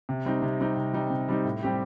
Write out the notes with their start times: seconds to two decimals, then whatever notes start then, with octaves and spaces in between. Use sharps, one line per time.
0.09 C3
0.25 G3 C4 D#4
0.42 C3
0.60 G3 C4 D#4
0.76 C3
0.93 G3 C4 D#4
1.10 C3
1.29 G3 C4 D#4
1.44 A2
1.63 G3 C4 G4